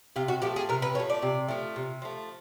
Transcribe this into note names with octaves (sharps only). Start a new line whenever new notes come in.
C3 F4
F#4
F3 A3 G4
G#4
C3 A#4
B4
F3 A3 C#5
D5
C3
F3 A3
C3
F3 A3